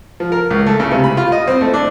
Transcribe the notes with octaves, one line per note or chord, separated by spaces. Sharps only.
F3
A#4
C#2
A3
C#3
C3
B5
F4
D#5
C4
A3
D4